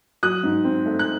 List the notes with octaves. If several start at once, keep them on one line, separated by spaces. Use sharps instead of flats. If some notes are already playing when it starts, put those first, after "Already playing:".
F#3 D#6 F#6
G#2
C4
A3
F#6